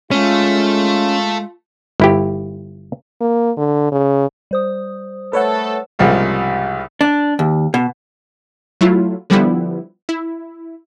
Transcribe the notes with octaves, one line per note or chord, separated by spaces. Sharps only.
G#3 A3 C#4 F4
G1 E4 G4
A#3
D3
C#3
G3 C5 D#6
A3 A4 B4 C#5 F#5
C2 G#2 C#3 F3 G3 A#3
D4
D#2
B2
F#3 A3 E4 F4
D3 F3 G3 B3 E4
E4